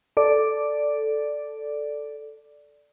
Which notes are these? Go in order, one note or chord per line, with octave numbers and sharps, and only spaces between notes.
A4 D5